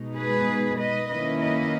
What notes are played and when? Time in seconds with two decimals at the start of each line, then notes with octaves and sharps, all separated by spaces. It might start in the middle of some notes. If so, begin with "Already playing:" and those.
Already playing: B2 G#3 D#4
0.16 G#4 B4
0.79 B4 D#5
1.10 D#3 A#3 C#4 E4 B4 D#5
1.41 B4 D#5